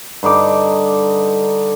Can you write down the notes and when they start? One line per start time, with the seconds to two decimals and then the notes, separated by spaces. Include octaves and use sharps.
0.23 G2 D3 D#4 D6